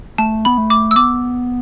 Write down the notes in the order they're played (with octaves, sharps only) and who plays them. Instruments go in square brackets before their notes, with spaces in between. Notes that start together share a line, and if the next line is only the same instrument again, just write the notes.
[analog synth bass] A3 [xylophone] A5
[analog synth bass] B3 [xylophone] B5
[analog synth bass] A3
[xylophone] D6
E6
[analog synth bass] B3 [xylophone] D6